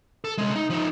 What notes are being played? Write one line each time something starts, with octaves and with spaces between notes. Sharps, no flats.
A4
C2 G#3
D#4
F3 D#4